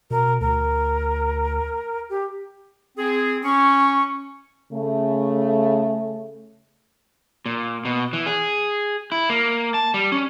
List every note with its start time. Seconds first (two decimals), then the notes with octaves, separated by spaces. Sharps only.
0.11 B2 A#4
0.41 D2 A#4
2.09 G4
2.98 C4 G#4
3.44 C#4 C#6
4.72 C#3 A3
7.46 A#2
7.85 B2
8.13 E3
8.26 G#4
9.12 E4
9.30 A#3
9.74 A5
9.94 G3
10.12 C#4